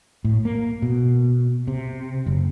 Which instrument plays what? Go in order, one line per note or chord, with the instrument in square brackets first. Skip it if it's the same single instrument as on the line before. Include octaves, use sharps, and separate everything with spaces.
[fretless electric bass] A2
A#3
B2
C3
F#1